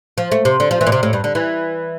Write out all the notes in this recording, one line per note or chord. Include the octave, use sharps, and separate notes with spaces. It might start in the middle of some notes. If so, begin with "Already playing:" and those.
F3
A3
C3
D3
F3
E3
A#2
C3
A2
G2
D3
E3